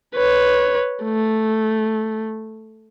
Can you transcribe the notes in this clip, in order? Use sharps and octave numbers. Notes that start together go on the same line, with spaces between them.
B4 C#5
A3